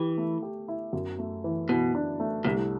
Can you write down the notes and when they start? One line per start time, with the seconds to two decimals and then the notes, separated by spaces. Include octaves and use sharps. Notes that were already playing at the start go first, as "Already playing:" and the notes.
Already playing: E3 G4
0.17 A3
0.42 G4
0.68 E4
0.93 F#2
1.19 A3
1.44 E3
1.69 B2 E3
1.95 D4
2.20 A3
2.45 C2 A2